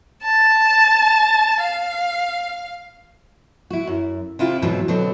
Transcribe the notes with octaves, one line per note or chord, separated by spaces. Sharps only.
A5
F5
E4 F#4
F#2
C3 E4 F4 G4
F2 G#2 B2 E3 F#3
B2 D3 F#3 C4